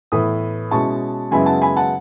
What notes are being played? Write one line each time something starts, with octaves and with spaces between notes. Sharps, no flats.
A2 E3 B3 B5 D#6
B2 G#3 C#4 E4 A5 C#6
F#2 C#3 G#3 B3 E4 G#5 B5
F#5 A5
G#5 B5
F#5 A5